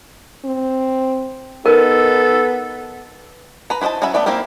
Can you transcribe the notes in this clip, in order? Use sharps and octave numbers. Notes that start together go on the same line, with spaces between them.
C4
B3 D#4 A4 A#4
B4 A#5
E4 B4 C5 D#5 A5
F#3 C#4 F#4 E5 B5
A3 B3 A4 D5 E5
A#3 C4 E4 G4 A#4